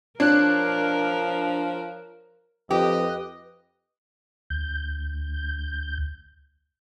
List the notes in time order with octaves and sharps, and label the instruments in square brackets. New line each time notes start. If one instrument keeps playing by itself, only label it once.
[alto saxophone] F3 [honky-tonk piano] D4 [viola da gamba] A#4 [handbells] C#5 F#6
[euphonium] F2 [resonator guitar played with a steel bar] G4 [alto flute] B4 [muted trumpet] D#5
[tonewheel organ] D2 G6